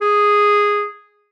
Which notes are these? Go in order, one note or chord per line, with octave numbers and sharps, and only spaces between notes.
G#4